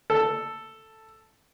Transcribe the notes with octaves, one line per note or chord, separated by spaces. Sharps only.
A4